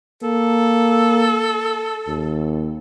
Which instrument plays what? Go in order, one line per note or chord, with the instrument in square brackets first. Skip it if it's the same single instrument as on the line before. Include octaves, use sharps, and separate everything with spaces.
[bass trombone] A#3 [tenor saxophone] A4
[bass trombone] D#2